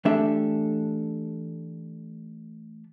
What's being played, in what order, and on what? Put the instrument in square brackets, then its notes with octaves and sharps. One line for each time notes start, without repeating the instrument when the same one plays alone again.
[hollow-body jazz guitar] E3 A3 D4 G4 A4 E5